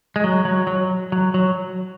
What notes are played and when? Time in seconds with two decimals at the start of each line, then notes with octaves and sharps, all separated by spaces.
0.16 G#3
0.24 F#3
0.45 F#3
0.67 F#3
1.12 F#3
1.34 F#3